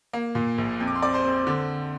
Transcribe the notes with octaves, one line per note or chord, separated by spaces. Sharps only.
A#3
A#2
A#1
F2
D6
C6
C4 D5 D6
C5 C6
C4
D3